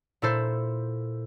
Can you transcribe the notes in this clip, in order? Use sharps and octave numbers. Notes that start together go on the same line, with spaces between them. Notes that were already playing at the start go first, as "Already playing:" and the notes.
A#2 E4 A4 C5